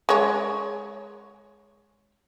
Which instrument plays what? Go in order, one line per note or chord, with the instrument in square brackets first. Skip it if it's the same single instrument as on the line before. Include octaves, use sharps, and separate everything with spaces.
[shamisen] G#3 C#5